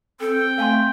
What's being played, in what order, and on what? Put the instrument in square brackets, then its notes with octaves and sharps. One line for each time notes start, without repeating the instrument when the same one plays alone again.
[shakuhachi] C4 [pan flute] A4 [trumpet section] G5
[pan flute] A3 [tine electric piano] F5 G#5 C6